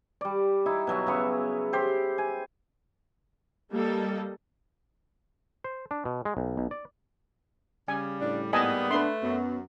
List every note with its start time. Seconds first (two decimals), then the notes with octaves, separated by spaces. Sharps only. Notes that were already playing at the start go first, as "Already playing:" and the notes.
0.21 G3 D5
0.66 D#4 E4
0.87 B2 F#3 E5
1.07 C#3 B3 C#6
1.73 G4 C5
2.18 G#5
3.73 G3 A#3 A4 D#5
5.64 C5
5.91 D4
6.05 B2
6.25 G#3
6.37 B1
6.57 B1
6.71 D5
7.88 C#3 G3 G#5
8.21 A2 D4
8.53 G#2 G3 A#3 B3 D#5 G#5 A5
8.91 A3 D4 B4 C6
9.23 F#2 F#3 B3